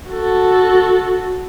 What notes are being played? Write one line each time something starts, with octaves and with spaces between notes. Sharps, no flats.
F#4 A4